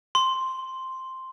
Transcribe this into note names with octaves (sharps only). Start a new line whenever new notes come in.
C6